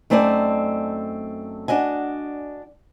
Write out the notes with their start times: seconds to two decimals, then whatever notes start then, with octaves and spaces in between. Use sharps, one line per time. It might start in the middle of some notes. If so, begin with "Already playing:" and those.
0.10 F#2 A3 C4 D#4 D5 G#5
1.68 D4 F#4 D#5 G#5